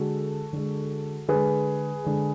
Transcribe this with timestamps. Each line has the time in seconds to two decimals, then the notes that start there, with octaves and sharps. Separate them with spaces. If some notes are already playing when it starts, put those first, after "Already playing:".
Already playing: D3 G#3 F#4 A4
0.53 D3 G#3
1.28 D3 G#3 G#4 B4
2.04 D3 G#3